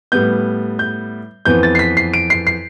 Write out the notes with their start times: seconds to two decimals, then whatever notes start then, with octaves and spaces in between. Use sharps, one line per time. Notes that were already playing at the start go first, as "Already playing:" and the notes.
0.12 A2 G3 B3 G6
0.79 G6
1.45 F2 E3 B3 G6
1.63 A6
1.75 C7
1.79 B6
1.97 C7
2.14 D7
2.30 C7
2.47 C7